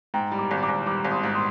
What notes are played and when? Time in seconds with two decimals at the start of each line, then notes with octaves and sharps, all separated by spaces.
0.14 G#2 G5 A#5
0.32 G3
0.38 A#5 D6
0.51 G#1
0.63 A#5 D6
0.69 G#1
0.86 G3 A#5 D6
1.05 G#1
1.11 C6 D#6
1.23 G#2
1.35 C6 D#6